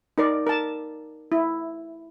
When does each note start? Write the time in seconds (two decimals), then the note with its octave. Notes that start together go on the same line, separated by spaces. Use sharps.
0.18 D#4 A#4 D5
0.47 A#4 A5
1.32 E4